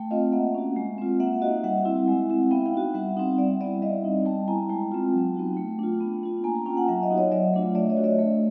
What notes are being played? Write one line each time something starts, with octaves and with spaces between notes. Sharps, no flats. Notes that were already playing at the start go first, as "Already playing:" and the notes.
Already playing: A3 G5 A5
C4 F4 D#5 F5
A#3 E5 F#5
C#4 F#4
G#3
C4 F4
A#3 E5 F#5
D#4 F#4 D#5 F5
G3 E5 F#5
C4 E4
G#3
C4 E4
B3 F5 G5
F5 G5
D#4 F#4
G3 E5 F#5
C4 D#4 E5 F#5
G3 D5 E5
B3 E4 D5 E5
G3 D#5 F5
C4 D#4
G3 G5 A5
B3 E4 G#5 A#5
G#3 G5 A5
C4 F4
F#3
B3 D#4 F#4
A3
D4 F4
B3
D4 F4
A#3 G#5 A#5
G#5 A#5
C#4 F4 G5 A5
F#5 G#5
F#3 E5 F#5
D#5 F5
B3 D#4 F#4
C#5 D#5
F#3 D5 E5
A3 D4 F4
A3 D5 E5
C#5 D#5
D4 F#4
D5 E5
A3